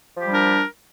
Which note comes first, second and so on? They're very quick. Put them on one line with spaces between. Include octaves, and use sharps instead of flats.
F3 G4 G3 D4 A#4